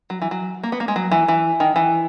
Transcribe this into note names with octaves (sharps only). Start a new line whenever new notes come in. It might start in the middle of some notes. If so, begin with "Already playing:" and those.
F#3
E3
F#3
A#3
B3
A#3
G#3
F#3
E3
E3
D#3
E3